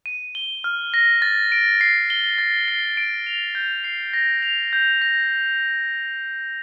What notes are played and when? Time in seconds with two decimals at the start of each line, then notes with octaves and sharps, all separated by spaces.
0.06 D#7
0.35 G7
0.64 F6
0.94 A#6
1.22 A6
1.52 D7
1.81 C7
2.10 G7
2.38 A6
2.68 C7
2.97 D7
3.27 F7
3.55 G6
3.84 C7
4.13 A#6
4.42 F7
4.73 G6
5.02 A#6